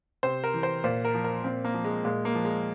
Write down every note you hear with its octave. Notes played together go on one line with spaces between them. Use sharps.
C3 C5
A#4
E3
C5
A#2 C5
A#4
F3
A#4
A#2 C4
A#3
F3
G#3
A#2 G#3
A#3
F3
G#3